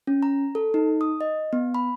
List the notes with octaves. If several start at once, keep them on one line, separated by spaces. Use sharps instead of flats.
C#4
A#5
A4
D#4
D#6
D#5
B3
B5